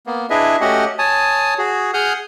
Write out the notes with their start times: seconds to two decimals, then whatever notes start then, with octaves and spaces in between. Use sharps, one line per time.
0.07 A#3 B3
0.30 D4 E4 G#4 B4 D#5 E5
0.61 A3 C#4 F#4 G4 D#5 F#5
0.99 C#5 G#5 A5 D#6
1.58 F#4 G#4
1.94 G#4 F#5 D#6 F6 G6